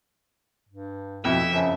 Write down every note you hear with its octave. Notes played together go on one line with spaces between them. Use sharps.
G2
F2 B2 E4 E5
F#2 C#3 F3